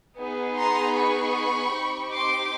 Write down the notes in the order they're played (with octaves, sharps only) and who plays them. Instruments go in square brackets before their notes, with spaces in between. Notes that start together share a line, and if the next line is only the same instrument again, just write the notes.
[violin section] B3 D#4 G#4
A#5 C6
B5 C#6
C4 D#4 G4
C6 D6